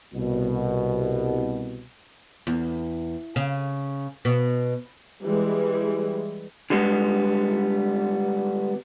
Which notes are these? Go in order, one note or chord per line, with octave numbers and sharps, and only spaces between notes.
C2 B2
E2
C#3
B2
E3 G3 G#3
D3 G3 G#3 B3